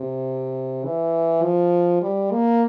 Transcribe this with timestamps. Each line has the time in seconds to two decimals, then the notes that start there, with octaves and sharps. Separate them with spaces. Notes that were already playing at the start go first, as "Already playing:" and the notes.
Already playing: C3
0.84 E3
1.43 F3
2.02 G3
2.31 A#3